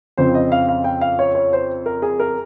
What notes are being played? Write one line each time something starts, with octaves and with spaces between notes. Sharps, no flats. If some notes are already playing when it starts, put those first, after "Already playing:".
F2 C#3 F3 C4 C5
D#5
F5
F5
G5
F5
C#5
C#5
C5
A#4
G#4
A#4